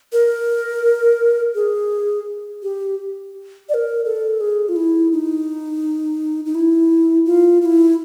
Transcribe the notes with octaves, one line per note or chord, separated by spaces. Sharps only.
A#4
G#4
G4
D5
A#4
A4
G#4
F4
E4
D#4
D#4
E4
F4
F4
E4